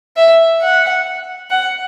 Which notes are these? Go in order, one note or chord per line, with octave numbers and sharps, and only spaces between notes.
E5
F#5
F#5